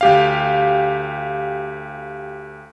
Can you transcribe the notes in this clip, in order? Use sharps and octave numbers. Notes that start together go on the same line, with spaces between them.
D2 G4 F5